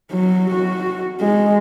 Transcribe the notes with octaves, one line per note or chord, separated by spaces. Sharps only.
F#3
F#4
G#3